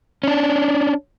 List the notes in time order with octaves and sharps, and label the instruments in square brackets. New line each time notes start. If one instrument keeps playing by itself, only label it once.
[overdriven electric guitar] C#4 D4